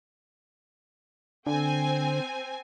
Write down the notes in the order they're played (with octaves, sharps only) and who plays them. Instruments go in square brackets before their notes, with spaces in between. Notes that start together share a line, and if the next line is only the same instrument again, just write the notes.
[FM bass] D3 [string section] C4 G#5